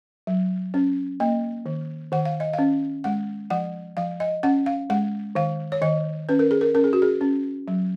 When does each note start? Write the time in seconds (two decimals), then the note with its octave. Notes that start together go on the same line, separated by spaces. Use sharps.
0.27 F#3
0.74 C#4
1.20 A#3 D#5
1.66 D#3
2.12 D#3 F#5
2.25 F5
2.40 D#5
2.53 C#4 F5
3.04 G#3 F#5
3.50 F3 F#5
3.97 F3 F5
4.20 D#5
4.43 C#4 F#5
4.66 F5
4.90 G#3 F#5
5.35 D#3 F5
5.72 C#5
5.82 D#3 D#5
6.29 C#4 B4
6.39 A#4
6.51 G#4
6.61 A#4
6.75 C#4 A#4
6.84 G#4
6.93 F#4
7.02 G#4
7.21 C#4
7.68 F#3